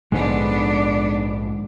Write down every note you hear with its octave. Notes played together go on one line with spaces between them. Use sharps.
A#1 G#2 D3 G#3 B3 D4 C5